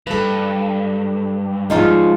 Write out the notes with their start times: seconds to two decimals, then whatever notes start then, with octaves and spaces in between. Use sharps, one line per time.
0.07 G2 A4 B4
1.70 G#2 D3 F3 G#3 D#4 F4